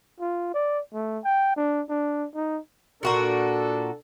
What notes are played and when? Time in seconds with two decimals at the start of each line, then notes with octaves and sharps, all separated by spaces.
0.20 F4
0.54 D5
0.94 A3
1.24 G5
1.57 D4
1.89 D4
2.35 D#4
3.03 A#2 D4 F#4 A4 A#4